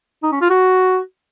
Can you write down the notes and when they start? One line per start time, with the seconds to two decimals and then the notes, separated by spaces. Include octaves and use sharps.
0.23 D#4
0.32 C#4
0.41 F4
0.50 F#4